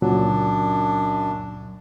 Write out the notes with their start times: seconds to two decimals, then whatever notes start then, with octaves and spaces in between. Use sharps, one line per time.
0.02 C#2 F#2 A#2 F#3 D4